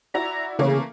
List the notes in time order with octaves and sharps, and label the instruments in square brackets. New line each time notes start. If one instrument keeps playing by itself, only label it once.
[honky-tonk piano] E4 F#4 D5 [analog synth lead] A#5
[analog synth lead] C#3 [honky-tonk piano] E3 A3 A#3